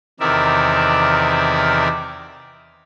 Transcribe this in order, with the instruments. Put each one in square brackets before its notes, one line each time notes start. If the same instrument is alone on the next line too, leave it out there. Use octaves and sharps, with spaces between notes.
[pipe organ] E2 C3 D#3 A#4 D5 E5